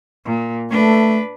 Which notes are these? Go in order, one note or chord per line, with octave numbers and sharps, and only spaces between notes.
A#2
A3 D4 B4